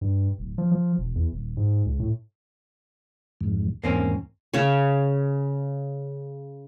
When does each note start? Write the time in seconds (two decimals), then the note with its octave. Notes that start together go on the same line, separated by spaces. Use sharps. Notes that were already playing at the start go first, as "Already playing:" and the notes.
0.01 G2
0.39 D1
0.58 F3
0.71 F3
0.98 E1
1.15 E2
1.33 D#1
1.57 G#2
1.86 C#2
2.00 A2
3.41 F2 G#2
3.84 E2 G#2 A#3 C4 C#4
4.54 C#3 C#5